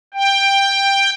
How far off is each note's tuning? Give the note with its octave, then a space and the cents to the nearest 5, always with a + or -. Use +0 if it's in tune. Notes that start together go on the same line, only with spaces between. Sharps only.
G5 +10